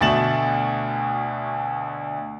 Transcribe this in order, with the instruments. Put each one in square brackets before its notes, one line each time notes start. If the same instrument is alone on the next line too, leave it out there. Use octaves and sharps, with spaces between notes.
[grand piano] D2 B2 A3 A6 E7 F#7